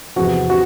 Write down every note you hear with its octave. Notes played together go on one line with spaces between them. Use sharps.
E2 C3 F3 F#4
C3 F#4